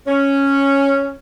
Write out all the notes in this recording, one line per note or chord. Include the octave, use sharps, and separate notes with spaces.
C#4